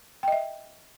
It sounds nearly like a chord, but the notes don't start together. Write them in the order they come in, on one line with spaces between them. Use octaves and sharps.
G5 D#5 E5